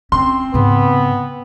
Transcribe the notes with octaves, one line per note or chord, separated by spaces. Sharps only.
C4 C#4 F4 C6
G#2 C#3 B3